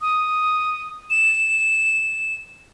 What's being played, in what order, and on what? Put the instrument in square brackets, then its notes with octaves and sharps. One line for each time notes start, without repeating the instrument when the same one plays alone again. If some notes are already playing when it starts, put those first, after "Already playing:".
[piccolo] D#6
E7